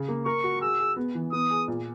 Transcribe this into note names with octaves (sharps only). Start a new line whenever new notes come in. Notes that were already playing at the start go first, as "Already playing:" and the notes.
Already playing: C#3
A#3
A#4 C#6
F#4
G#4 E6
G#4
B3
E3
B3 D#6
G#4
A#2